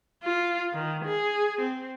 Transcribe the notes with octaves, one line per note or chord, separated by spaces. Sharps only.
F4
D#3
G#4
C4